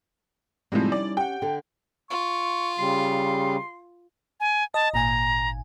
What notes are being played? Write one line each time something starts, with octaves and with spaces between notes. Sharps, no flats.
A2 C3 F3 G3 G#3 D#4 E4 E5
C#4 D5
G4 F#5 G5
D3 A4
F4 C#6
C#3 G3 C6
G#5
D#5 A5
G#1 A#2 G#5 A#5